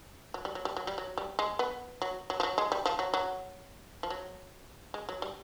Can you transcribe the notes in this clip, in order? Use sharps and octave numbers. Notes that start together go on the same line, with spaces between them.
F#3
G3
F#3
G3
F#3
G3
F#3
G3
G#3
B3
F#3
F#3
F3
F#3
G#3
G3
F3
F#3
F#3
F3
F#3
G#3
F#3
G3